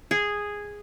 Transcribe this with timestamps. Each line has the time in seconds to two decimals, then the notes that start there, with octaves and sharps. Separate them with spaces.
0.11 G#4